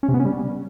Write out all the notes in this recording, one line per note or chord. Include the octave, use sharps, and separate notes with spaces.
C#4
C3
B3
C#4
G3